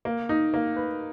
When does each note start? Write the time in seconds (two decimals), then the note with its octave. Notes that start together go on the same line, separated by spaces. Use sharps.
0.05 A#3
0.29 D#4
0.54 A#3
0.76 B4